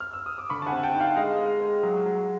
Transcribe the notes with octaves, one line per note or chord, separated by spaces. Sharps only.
F6
E6
D#6
D6
D3 B5 C#6
A5
F#5 G#5
C4
G5 A5
D#4
F5 G5
G#3 D#5 F5
G#3
G#3
F#3
F#3